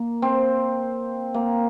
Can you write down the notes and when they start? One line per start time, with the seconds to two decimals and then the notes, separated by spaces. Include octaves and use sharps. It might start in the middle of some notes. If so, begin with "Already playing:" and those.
Already playing: A#3
0.22 C4
1.34 A#3